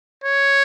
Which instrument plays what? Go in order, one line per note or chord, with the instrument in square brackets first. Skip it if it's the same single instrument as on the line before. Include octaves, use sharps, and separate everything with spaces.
[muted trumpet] C#5